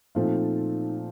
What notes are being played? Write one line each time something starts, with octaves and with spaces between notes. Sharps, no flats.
A#2 F3 A3 C4 D#4 F4